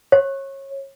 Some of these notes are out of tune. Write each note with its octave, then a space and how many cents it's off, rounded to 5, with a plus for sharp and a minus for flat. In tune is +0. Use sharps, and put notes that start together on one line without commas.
C#5 -25